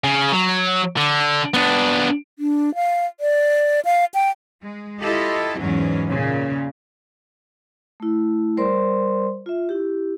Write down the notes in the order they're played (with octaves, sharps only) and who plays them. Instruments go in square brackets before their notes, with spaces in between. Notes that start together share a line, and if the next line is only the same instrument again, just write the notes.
[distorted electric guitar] C#3
F#3
D3
B3 D4
[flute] D4
F5
D5
F5
G5
[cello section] G#3
E4 F4 G4 A4 D#5
E2 G#2 E3 F#3 C#4
A#2 C#3
[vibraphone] A3 E4
G3 A#4 C5 D5 C6
F4 E5
E4 G4